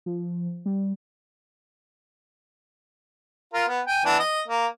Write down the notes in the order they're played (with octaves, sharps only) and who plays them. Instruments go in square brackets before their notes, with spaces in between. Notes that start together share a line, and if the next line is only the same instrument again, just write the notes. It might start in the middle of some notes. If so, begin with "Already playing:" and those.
[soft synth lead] F3
G3
[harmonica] F4 A#4
B3
G5 G#5
E3 B3 D4
D#5
A#3